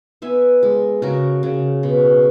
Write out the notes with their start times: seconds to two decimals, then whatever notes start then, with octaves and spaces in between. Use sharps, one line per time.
0.22 B3 E5 G#5
0.63 G#3
1.02 C#3 F#4 A#4
1.43 C#3
1.83 B2